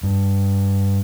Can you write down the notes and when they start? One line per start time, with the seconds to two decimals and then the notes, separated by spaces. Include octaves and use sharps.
0.03 G2